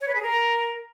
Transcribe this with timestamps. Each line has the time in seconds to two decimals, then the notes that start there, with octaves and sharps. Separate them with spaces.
0.01 C#5
0.08 B4
0.15 G#4
0.22 A#4